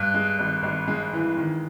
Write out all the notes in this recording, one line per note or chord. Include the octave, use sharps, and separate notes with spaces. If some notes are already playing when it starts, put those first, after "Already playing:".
Already playing: G2
G#3
G#1
G#1
G#3
E3
D#3